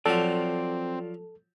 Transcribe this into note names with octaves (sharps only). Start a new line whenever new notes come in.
F3 F#3 C4 F4 A4 D5